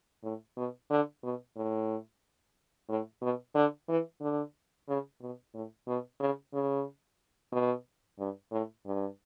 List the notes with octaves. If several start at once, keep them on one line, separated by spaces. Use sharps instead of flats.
A2
B2
D3
B2
A2
A2
B2
D3
E3
D3
C#3
B2
A2
B2
C#3
C#3
B2
G2
A2
G2